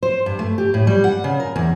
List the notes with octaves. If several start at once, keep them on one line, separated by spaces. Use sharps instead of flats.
C5
G2
A3
G4
A2
G3
F#5
C#3
A#4
E2